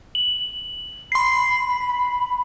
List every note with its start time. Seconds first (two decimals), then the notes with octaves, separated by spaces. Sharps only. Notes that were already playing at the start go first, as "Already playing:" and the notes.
0.15 F#7
1.12 B5 C6 C7